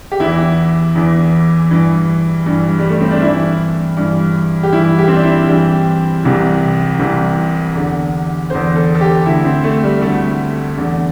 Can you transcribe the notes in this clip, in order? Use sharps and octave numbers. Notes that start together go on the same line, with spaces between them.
G4
E2 E3 E4
E2 E3
G2 E3
G2 E3
G3
A3
C4
D4
G2 E3 E4
G2 E3
G4
G2 E3 E4
G4
C4
D4
E4
G2 E3 G4
C2 C3 E3
C2 C3 E3
E2 D3
E2 D3 C5
A4
A4
G4
D2 D3 E4
C4
A3
G3
D2 D3 A3
E2 D3